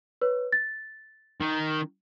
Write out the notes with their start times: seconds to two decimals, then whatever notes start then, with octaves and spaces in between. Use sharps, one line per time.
0.22 B4 C#5
0.52 A6
1.41 D#3